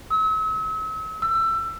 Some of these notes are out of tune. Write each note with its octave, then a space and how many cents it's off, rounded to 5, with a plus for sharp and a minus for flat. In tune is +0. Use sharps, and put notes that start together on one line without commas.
E6 -40
E6 +20